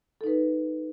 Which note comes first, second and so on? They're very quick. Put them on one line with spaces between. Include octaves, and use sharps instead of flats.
A4 D#4 B4